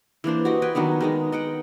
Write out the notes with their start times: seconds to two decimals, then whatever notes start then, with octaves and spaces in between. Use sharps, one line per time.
0.24 E3 A#3 D4 C5
0.45 F#4 G4 D5 D#5
0.62 B4 G5 G#5
0.75 D#3 F#3 B3 D4
1.01 D#3 G#3 D#4
1.32 D#5 F#5 G5